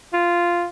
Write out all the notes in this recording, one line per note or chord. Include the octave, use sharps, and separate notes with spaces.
F4